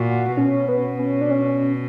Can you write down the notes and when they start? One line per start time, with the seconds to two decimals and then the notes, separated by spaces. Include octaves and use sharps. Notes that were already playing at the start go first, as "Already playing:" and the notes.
Already playing: A#2 F#4
0.36 B2 C#4
0.68 B3
0.99 C#4
1.21 D4
1.31 C#4